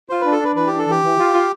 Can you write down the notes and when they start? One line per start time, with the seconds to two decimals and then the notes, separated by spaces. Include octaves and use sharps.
0.09 F4 C5
0.21 D4 B4
0.32 A4
0.39 D4
0.44 B4
0.55 E3 B4
0.67 D4 G4
0.79 A4
0.86 E3 G4
1.02 E3
1.18 F4
1.33 F4